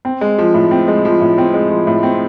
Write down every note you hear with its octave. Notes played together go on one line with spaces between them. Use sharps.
C4
G#3
F3
A2
C4
G#3
F3
A2
C4
G#3
F3
A2
C4